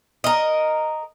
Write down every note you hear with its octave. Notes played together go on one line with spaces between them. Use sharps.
A#4 D#5